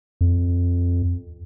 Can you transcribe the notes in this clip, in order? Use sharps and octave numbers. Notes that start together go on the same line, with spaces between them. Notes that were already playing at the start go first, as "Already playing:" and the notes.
F2